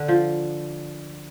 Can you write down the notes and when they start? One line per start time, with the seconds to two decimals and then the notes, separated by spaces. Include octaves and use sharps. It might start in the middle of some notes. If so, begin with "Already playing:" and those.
Already playing: D3
0.08 F3